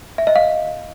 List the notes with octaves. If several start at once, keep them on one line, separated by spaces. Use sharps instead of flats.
E5
D#5
F5